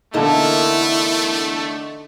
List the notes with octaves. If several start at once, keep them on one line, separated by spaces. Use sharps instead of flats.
E2 D3 A3 A#3 D#4 E4 A4